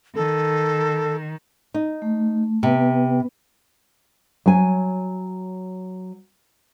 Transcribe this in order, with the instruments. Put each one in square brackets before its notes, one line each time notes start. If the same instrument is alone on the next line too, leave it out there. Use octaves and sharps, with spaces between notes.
[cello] D#3 [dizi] A4
[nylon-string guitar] D#4
[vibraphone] A3
[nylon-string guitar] C3 [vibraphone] B3 B4
[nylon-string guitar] F#3 G#5